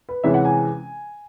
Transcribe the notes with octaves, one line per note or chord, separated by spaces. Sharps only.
B4
C3 E3 G#3 C#4 E5
F#5
G#5